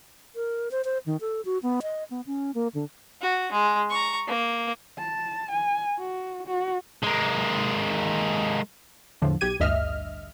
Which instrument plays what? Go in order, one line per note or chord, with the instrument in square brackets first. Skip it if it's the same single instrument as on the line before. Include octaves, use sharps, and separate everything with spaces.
[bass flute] A#4
C5
C5
D#3
A4
F#4
B3
D#5
B3
C#4
A#3
D3
[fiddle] F#4
G#3
A#5 C#6
A#3
[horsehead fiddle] A5
G#5
F#4
F#4
[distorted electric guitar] G#3 A#3
[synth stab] E2 A2 D3 F3
B1 G4 G#6 D#7
A1 D2 G2 D#5 E5 F6